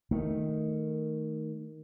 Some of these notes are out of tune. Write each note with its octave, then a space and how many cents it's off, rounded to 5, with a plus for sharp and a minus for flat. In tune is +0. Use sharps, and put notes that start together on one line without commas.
D#3 +0 A3 +0